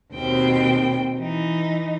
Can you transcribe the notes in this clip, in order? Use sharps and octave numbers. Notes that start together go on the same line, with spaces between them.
D#2 B2 C4 G5
E3 D#4